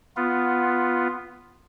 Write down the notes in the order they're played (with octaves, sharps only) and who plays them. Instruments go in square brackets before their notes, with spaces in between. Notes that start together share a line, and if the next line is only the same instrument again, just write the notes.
[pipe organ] B3 F4